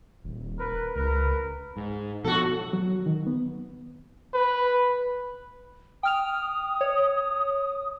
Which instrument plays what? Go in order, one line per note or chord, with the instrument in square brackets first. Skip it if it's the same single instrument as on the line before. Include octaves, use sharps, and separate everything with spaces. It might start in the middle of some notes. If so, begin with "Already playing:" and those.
[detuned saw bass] D#1
[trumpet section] A#4 B4
[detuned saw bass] C#2 [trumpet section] A#4 B4
[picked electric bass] G#2
[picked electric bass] B2 F3 [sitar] F#4 A4
[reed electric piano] F#3
D#3
B3
[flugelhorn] B4
[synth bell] G5 F6 F7 [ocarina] D#6
[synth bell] C#5